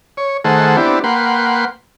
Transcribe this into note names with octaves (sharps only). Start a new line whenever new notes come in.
C#5
D#3 A3 G#4 A4 C5 F#5
B3 C4 D4 E4 G4
A#3 B4 F#5 G5 C6